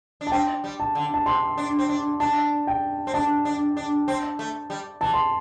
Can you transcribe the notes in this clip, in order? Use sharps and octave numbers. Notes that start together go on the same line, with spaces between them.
D4
A5
C4 G5
G3
A5
D3
A5
C3 C6
D4
C4
D4
D4 A5
G5
C4
D4 A5
D4
D4
C4
A3
G3
E3 A5
C6